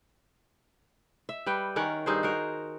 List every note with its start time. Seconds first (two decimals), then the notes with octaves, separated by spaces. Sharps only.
1.29 E5
1.46 G3 B4 G5
1.76 D#3 C#4 A#4 F#5
2.06 G2 D#4 G#4 C5
2.23 F#4 A#4